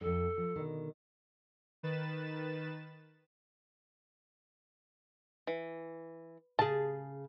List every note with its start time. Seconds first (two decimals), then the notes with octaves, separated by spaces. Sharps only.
0.01 F2 G#2 A4
0.38 F3
0.56 B2 D3 D#3
1.83 D#3 B4 A6 E7
5.47 E3
6.59 C#3 G#4 A5